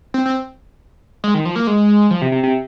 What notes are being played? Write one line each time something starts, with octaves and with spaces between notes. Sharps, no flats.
C4
C4
G#3
D#3
F3
A#3
G#3
F3
C3
C3
C3